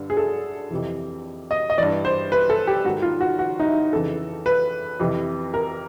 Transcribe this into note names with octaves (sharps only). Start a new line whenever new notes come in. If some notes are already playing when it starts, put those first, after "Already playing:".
Already playing: G2 D3
G#4
A4
F2 C3 E3
D#5
D#5
G2 E3 D5
C5
B4
A4
G4
G#2 D#3 F#4
F4
F#4
F#4
D#4
E4
F2 C#3 E3 A4
B4
F2 C3 E3
A#4